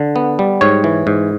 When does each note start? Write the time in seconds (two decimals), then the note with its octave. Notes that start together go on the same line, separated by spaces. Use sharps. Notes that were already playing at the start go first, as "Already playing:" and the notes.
Already playing: D3
0.16 B3
0.39 G3
0.61 G#2 C#5
0.84 E3
1.07 G#2